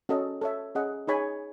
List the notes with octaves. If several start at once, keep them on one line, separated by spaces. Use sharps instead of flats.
C#4 F#4 A4 D#5
A4 C#5 E5
C#4 G#4 D#5 F#5
D#4 G#4 C#5 G#5 B5